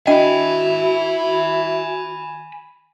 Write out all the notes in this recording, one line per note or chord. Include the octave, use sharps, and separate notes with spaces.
D4 E4 F#4 D#5 G5 G#5 B5